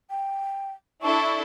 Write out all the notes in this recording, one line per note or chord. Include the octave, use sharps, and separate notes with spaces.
G5
D4 E4 A4 C#6